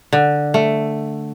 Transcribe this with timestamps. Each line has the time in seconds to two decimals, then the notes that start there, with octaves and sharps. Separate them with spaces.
0.13 D3
0.54 A3